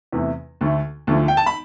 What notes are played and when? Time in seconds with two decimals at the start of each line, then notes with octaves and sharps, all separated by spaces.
0.13 E2 C3 E3 A3
0.61 D2 D3 A3
1.07 D2 D3 F3 A3
1.28 G5
1.37 A5
1.46 B5